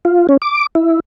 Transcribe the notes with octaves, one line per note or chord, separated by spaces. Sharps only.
F4
C#4
D6
E4